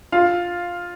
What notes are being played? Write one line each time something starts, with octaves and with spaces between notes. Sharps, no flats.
F4 F5